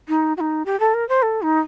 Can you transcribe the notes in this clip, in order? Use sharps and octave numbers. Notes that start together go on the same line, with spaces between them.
D#4
F#4
D#4
G4
A4
A#4
C5
A4
D#4